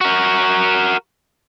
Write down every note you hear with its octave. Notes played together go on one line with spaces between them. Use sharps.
F#4 A#4